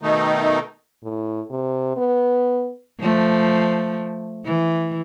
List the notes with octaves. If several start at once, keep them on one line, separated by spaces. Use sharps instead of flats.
B2 D#3 A3 D#4
A2
C3
B3
F3 A3
E3